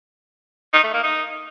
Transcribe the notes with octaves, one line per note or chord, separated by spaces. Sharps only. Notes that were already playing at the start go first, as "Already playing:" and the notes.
D#4
A3
A#3
D#4